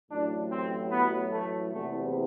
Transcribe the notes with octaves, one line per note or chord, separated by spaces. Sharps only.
A1 A2 F#3 D4
C4
B3
A3
F#1 E2 C3 A3